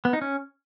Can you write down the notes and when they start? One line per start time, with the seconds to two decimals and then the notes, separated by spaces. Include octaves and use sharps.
0.05 B3
0.13 D#4
0.22 C#4